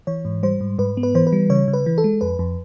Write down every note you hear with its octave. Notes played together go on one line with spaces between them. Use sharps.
E3 C#5
G#2
G3 C5
G#2
G#2 B4
B3
B4
E3 C5
B4
G3
C#3 C#5
C#3
B4
E3
A4
G#3
F2 B4
F2